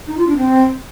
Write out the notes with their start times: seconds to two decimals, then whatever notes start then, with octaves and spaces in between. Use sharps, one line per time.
0.07 D#4
0.17 F4
0.27 D4
0.37 C4